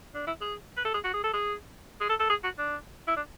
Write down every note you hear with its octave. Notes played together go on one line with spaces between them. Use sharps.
D4
E4
G#4
B4
A4
G#4
F#4
G#4
A4
G#4
G#4
A4
A4
G#4
F#4
D4
E4
D4